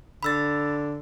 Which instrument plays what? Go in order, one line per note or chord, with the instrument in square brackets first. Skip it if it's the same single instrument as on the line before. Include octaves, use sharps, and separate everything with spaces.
[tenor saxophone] D3 [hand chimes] B5 E6 A6